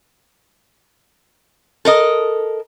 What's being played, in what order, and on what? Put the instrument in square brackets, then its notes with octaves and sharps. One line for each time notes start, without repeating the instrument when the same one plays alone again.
[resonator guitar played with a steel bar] A4 A#4 D#5